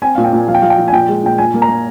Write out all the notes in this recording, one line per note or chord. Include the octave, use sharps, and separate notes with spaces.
C4 G#5
A#2 F5
G5
A#2
F3 F5
G5
F3 F5
G5
F3
G#5
A#2 G5
G#3
A#2 G5
A#2 G#5
A#3
A#5
A#3